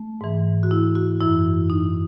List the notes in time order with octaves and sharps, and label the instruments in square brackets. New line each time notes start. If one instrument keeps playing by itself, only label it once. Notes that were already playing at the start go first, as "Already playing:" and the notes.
Already playing: [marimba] A3
G#2 E3
F#4
E4
F#4
F#2 E3 E4
D#4